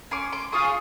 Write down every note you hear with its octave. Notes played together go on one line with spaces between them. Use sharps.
C#4 C6 D6
C6 D6
F4 G#4 C#6 D#6